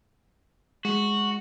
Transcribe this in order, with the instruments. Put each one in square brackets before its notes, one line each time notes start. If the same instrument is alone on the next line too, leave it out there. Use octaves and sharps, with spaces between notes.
[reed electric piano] G#3 [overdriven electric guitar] F#4